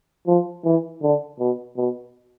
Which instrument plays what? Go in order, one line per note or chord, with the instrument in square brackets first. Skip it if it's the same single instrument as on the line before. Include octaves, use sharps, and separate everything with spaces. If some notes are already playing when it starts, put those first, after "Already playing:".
[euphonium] F3
E3
D3
B2
B2